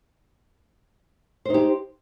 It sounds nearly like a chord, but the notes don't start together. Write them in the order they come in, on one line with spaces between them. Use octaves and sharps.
C5 D#4 G4